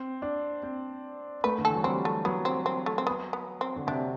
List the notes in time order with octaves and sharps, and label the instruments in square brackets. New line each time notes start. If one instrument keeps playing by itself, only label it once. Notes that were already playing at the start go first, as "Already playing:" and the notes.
Already playing: [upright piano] C4
D4
C4
[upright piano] A3 [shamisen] B4
[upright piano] D3
[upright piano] E3 [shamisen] A4
[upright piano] F#3
[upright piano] G3 [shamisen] C4
[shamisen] A3
[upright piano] F#3 [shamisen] B3
[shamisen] C4
C4
A3
C4
B3
B3
C4
[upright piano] D3
[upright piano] C3 [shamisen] D4